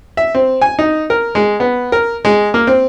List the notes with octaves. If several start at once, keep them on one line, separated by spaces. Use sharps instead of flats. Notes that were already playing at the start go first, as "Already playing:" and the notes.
E5
C4
G#5
D#4
A#4
G#3
B3
A#4
G#3
A#3
C4